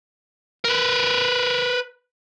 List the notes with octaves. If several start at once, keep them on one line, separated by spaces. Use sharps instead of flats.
A#4 B4